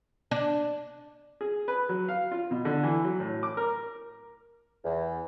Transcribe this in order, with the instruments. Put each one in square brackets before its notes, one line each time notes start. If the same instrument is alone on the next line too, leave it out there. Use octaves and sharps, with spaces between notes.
[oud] D4
[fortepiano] G#4
B4
F#3
F5
F4
B2
D3
E3
F#3
A2
D6
A#4
[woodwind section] E2